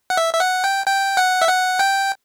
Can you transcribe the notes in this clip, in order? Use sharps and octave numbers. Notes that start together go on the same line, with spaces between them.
F#5
E5
E5
F#5
G5
G5
F#5
E5
F#5
G5